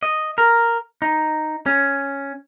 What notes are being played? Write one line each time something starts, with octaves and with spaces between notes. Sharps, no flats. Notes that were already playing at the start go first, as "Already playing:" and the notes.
D#5
A#4
D#4
C#4